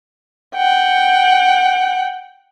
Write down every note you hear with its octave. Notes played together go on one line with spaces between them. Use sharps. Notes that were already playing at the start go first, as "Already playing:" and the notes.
F#5 G5